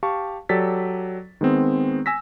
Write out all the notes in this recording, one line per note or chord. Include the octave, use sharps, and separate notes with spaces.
G4 F5 A5 C#6
F#3 G4 A4 D5 A6 B6
D#3 G#3 B3 C4
G#5 E6 A#6 B6